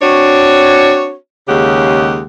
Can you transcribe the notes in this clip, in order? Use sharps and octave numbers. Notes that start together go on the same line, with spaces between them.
C4 D4 F#4 C#5
D#2 C#3 G#3 G4 F#5